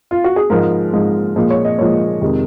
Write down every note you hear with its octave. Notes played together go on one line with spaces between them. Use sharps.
F4
F#4
G#4
G#2 F3 G#3 A#4
G#2 F3 G#3
A#2 F3 G#3
C#5
D#5
A#2 F3 G#3 C#5
F2 C3 D#3 G#3